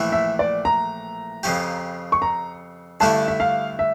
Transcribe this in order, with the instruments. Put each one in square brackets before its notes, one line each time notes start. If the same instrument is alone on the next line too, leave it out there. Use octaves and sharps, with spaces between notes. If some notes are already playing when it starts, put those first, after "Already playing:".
Already playing: [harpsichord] A#1 A2 E3 A3 E4
[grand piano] E5
D5
A#5
[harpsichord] F2 C#3 F3 C#4 G4
[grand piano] C#6
A#5
[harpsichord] G2 D3 A3 C#4 E4 [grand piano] A5
[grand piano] E5
F5
E5